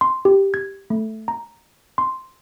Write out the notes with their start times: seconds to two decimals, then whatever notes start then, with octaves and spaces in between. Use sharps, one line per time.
0.01 C6
0.25 G4
0.54 G#6
0.90 A3
1.28 A#5
1.98 C6